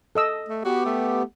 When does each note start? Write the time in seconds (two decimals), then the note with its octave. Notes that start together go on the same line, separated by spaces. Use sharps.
0.15 A4 D#5 E6
0.49 A3
0.65 B3 F#4 G4
0.86 A3